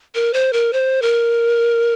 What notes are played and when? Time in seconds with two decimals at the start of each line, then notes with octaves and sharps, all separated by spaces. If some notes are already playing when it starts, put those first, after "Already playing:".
0.15 A#4
0.34 C5
0.53 A#4
0.73 C5
1.02 A#4